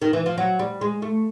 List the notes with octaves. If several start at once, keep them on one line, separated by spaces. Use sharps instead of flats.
D#3
E3
F3
F#3
G3
G#3
A3